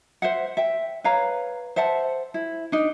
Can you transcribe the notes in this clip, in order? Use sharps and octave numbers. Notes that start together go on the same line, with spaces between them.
C5 E5 F#5
E5 G5
B4 C#5 F5 A#5
C5 E5 F#5 A5
E4
D4 D#4